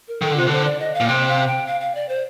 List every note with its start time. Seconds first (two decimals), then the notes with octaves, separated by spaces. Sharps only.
0.08 A#4
0.22 D#3 A4
0.31 D3
0.36 C3 F4
0.47 D3 C5
0.65 D5
0.80 D#5
0.94 F5
1.00 A#2
1.08 C3 G5
1.28 F5
1.47 G5
1.67 F5
1.80 F5
1.95 D5
2.09 C5